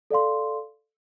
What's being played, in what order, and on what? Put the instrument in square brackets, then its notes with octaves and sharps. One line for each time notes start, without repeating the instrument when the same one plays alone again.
[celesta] A4 D5 F5 C6